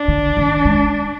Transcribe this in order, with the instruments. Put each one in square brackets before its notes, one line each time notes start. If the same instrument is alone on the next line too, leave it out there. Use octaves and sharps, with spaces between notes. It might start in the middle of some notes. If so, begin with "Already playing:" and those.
Already playing: [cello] D4
[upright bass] D3
D#3
G#3